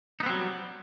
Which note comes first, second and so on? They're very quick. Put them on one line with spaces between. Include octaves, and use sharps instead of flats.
D#4 B3 C4 F#3 G3